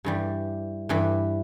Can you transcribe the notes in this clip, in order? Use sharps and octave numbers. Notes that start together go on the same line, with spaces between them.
G2 E3 G3
G2 E3 G3